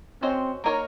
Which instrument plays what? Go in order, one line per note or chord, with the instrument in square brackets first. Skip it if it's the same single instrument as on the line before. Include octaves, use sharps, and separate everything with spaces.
[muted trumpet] C4 [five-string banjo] C#4 F#4 C5 D#5
[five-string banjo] A#3 D#4 A#4 C#5